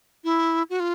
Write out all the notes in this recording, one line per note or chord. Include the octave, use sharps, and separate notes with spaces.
E4
F#4
F4